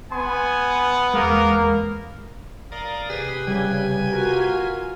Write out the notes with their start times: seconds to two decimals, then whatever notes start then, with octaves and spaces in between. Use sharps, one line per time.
0.12 B3 G#5 C6
1.14 E2 G#3 A#3 A#4
2.72 A#4 D5 F5 D#6
3.10 C3 G4 G#4 B4
3.47 C#3 G3 G#4 G#5
4.12 F4 F#4 A#4